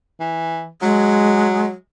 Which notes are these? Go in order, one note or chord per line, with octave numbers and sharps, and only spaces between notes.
E3
F#3 G#3